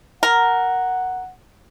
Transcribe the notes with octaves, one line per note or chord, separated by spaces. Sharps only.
A#4 F#5